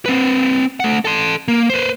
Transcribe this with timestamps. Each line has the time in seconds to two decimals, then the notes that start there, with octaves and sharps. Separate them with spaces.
0.06 C4 B4
0.80 A3 F#5
1.05 A4 C6
1.48 A#3
1.70 B4 C5